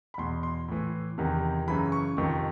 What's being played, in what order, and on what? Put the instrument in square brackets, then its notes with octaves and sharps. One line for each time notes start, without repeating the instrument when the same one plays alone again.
[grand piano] B5
E2 B2 C6
C6
A2 E3
E2 C3 D#3
F#2 C#3 E3 B5
C#6
F2 C3 D#3 C#6